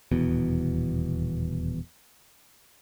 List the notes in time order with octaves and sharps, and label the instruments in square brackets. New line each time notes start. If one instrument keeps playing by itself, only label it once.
[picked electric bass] D#1 E2 B2